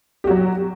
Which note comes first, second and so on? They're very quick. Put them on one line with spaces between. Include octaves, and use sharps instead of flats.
G4 F#4 F#3